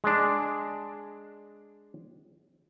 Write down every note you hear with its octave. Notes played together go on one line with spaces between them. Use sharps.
G#3 D4